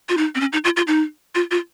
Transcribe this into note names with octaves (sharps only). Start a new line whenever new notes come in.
F4
D#4
C4
C#4
D#4
F4
F4
D#4
F4
F4